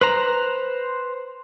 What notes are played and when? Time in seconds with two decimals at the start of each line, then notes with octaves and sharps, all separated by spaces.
0.01 B4 C5 A#5